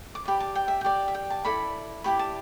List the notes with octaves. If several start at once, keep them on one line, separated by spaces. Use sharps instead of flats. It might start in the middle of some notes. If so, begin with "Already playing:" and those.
D6
G4 D5 B5
A5
G5
E5
G4 D5 G5
E5
G5
A5
E4 A4 D5 B5
E4 G4 D5 B5
A5